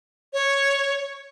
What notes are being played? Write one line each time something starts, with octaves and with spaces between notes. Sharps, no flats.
C#5